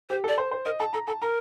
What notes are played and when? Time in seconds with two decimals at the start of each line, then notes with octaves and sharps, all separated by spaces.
0.09 G4 C5
0.24 A4 D5
0.38 C5
0.51 C5
0.65 A#4 D#5
0.79 A4 A5
0.93 A4 A#5
1.07 A4 A5
1.22 A#4 A#5